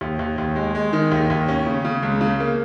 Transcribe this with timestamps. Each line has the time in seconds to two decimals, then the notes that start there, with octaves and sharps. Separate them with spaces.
0.01 D#2
0.19 D#2
0.38 D#2
0.56 G#3
0.75 G#3
0.93 D#3
1.12 D#2
1.30 D#2
1.48 C#4
1.66 C#3
1.85 C#3
2.03 C#2
2.21 C#3
2.40 A#3